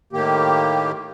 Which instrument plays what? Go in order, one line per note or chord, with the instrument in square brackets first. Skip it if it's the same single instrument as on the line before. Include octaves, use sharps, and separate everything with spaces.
[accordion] A2 D#3 A#3 G4